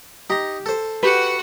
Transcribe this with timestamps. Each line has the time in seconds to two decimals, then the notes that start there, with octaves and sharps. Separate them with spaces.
0.30 D#4 G4 A#5
0.66 A4 C5
1.03 F#4 G4 B4 F#5